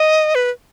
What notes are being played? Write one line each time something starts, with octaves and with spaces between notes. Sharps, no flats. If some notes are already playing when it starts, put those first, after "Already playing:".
Already playing: D#5
B4